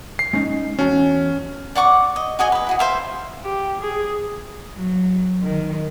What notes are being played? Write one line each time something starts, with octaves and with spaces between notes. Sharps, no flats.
C7
G#3 C#4 D#4
E2 C#4 F#4 A5
D5 F#5 C#6 D6
D#5
F#4 G#4 D#5 G#5
B4 D#5
E4 F#4 G#4
C5 E5 F5
G4
G#4
F#3
D#3